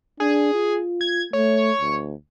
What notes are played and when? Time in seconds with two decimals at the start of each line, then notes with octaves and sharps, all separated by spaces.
0.20 D4 G#4
0.54 F4
1.01 G#6
1.33 A3 C#5
1.81 D2